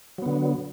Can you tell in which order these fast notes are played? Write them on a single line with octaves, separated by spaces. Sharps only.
F#3 B3 D3